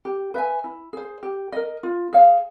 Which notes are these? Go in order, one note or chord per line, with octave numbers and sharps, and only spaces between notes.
G4
B4 E5 G#5
E4
G#4 C5
G4
A#4 D#5
F4
G#4 C#5 F5